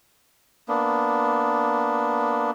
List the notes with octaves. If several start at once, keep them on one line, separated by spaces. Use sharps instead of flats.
A#3 B3 D4